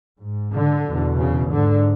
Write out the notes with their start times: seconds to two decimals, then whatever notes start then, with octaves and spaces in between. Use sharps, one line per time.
0.20 G#2
0.53 D3
0.86 E2 B2
1.18 C#3
1.51 G#2 D3